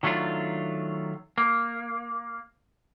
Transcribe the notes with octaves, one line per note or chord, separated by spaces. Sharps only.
D#3 F#3 A3 D4 F4
A#3